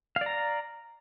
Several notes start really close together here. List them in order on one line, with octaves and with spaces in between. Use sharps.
F5 D5 A#5